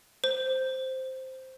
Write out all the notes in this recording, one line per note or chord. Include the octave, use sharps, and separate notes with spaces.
C5